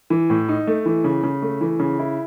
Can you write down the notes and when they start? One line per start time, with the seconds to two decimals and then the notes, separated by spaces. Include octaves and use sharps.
0.10 E3
0.30 A2
0.49 D#4
0.67 A3
0.86 E3
1.04 C#3
1.23 C#3
1.42 A3
1.61 E3
1.80 C#3
1.99 E4